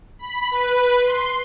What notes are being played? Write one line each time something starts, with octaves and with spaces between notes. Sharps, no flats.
B5
B4
C6